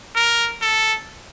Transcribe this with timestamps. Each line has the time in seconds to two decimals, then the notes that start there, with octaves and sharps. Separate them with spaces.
0.16 A#4
0.62 A4